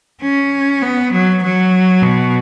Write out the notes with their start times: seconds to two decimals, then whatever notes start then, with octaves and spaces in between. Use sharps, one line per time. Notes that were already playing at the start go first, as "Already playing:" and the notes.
0.23 C#4
0.82 B3
1.12 F#3
1.43 F#3
2.02 B2